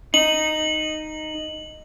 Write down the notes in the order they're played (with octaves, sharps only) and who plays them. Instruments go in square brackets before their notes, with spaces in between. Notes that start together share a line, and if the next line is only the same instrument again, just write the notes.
[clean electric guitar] D#4 [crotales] F#7